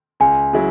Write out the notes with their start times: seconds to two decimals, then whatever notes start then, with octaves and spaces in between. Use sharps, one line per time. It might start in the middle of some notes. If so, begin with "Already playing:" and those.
0.20 C#2 G#5
0.53 C#3 F#3 E4